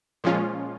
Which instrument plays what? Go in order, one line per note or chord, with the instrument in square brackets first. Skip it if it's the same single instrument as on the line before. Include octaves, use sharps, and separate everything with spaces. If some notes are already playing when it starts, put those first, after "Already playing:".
[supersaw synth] A#2 F3 G#3 C#4 F4